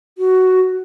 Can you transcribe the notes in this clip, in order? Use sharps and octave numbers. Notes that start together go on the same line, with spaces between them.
F#4